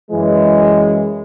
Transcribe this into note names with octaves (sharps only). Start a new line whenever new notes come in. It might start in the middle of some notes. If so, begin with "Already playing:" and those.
F#2 E3 G#3